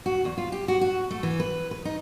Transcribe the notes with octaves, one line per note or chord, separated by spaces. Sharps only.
F#4
E2
F4
G4
F#4
F#4
A3
E3
B4
B4
D#4